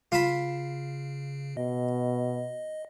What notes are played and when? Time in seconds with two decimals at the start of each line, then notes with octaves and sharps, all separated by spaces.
0.12 C#3 F4 A5 B5
1.57 B2 D#5